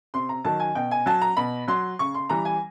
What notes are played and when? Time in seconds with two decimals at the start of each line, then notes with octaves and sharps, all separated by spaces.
0.14 C3 C6
0.29 A#5
0.45 D#3 F#3 A5
0.60 G#5
0.75 B2 G5
0.91 G#5
1.06 F#3 A5
1.21 A#5
1.37 B2 B5
1.68 F#3 C6
1.99 C#3 C#6
2.14 C6
2.29 E3 G3 A#5
2.45 G#5